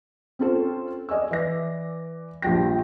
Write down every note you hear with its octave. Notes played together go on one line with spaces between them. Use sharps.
C4 C#4 F4 A4 C5
D5 D#5 G#5 E6
E3 D5 A#6
A#1 F3 G3 G5 A#6